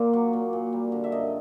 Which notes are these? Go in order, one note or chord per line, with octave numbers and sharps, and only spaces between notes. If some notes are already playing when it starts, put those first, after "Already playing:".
Already playing: A#2 A#3 D5
F#3
A#2
A#2
G3
D3
E5
F#2 D#5